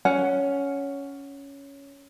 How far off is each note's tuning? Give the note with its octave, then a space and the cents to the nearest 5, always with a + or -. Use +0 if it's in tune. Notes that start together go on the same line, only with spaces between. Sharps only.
C#4 +10 F#5 +0